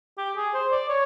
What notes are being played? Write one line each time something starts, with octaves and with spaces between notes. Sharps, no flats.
G4
G#4
C5
D5
C#5